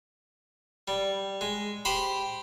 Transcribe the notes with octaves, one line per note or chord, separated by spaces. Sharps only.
G3
G#3
G4 C5 B5